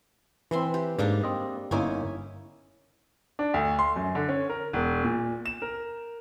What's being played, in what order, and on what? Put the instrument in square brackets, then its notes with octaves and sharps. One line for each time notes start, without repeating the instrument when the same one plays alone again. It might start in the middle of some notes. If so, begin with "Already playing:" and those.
[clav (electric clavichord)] E3 C4 [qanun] B4 E5 C6
[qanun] G4
[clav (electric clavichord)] G#2 [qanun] G3 A#3 D4
[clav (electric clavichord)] C4 D#5
[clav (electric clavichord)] G1 A#3 D#4 [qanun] C#4 E4 G#5
[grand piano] D4
D2
C6
F#2
D3
C#4
A#4
E1
A#2
E7
A#4